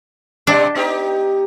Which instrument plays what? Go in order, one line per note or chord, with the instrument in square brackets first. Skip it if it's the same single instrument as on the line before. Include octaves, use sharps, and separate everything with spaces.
[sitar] B2 G3 D5 [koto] D4
[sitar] B3 D#4 G4